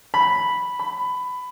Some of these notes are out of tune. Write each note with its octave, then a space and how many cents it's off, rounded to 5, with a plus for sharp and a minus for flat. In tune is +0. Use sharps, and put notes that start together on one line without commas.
B5 -5
B5 +15